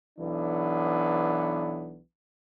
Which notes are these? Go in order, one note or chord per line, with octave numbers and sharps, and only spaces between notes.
B1 E3 B3 D4